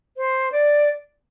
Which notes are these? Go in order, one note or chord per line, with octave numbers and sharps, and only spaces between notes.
C5
D5